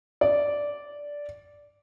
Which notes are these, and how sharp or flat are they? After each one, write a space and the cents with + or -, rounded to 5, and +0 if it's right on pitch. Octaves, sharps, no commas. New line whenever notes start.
D5 -10